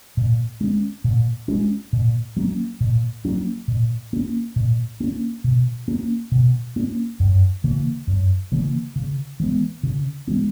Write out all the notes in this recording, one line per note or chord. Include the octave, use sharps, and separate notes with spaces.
A#2
G#3 C#4
A#2
G#3 C#4
A#2
F#3 A#3 C#4
A#2
F#3 A#3 C#4
A#2
A#3 C#4
A#2
A#3 C#4
B2
A#3 C#4
B2
A#3 C#4
F#2
C#3 E3 A#3
F#2
C#3 E3 A#3
C#3
E3 G#3 B3
C#3
E3 G#3 B3